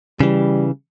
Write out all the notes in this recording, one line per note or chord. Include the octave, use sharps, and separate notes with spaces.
C#3 E3 G3